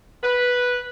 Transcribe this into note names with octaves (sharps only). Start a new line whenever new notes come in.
B4